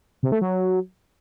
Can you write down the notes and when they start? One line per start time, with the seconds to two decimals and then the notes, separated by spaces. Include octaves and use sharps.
0.23 C3
0.32 A3
0.41 F#3